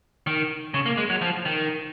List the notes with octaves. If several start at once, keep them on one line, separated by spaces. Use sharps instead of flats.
D#3
C#3
A#3
G#3
F#3
F3
D#3